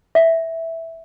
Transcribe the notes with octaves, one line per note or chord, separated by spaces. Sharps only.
E5